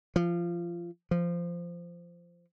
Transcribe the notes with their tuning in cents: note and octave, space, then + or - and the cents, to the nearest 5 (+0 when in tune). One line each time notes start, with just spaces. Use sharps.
F3 -20
F3 -15